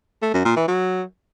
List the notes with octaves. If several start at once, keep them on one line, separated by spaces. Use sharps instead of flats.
A3
F#2
A#2
E3
F#3